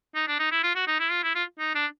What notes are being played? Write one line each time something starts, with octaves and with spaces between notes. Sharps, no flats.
D#4
D4
D#4
E4
F4
F#4
D#4
E4
F4
E4
F4
D#4
D4